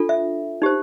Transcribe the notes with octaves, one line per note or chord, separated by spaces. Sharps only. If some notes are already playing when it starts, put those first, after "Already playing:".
Already playing: D4 F4 A4
E5
D#4 G4 C5